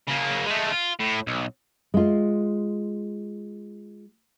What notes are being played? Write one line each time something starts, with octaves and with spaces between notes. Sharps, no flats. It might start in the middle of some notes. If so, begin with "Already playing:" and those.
C#3 A#3
G#3 A3
F4
A2
B1
G#3 F4